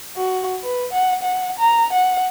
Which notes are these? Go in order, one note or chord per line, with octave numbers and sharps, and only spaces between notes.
F#4
B4
F#5
F#5
A#5
F#5